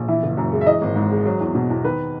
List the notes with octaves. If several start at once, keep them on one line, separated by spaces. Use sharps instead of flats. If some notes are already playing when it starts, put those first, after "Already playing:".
Already playing: A#1
E3 E4
F#1
F#2
G#3
E5
E3 D#5
G#1
G#2
G#3
F#3
E2
B2
E2
D#3 B4